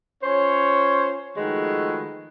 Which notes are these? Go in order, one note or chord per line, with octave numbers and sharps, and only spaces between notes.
C#4 F4 C5 C#5
D#3 F3 G#3 A3 F#4 B4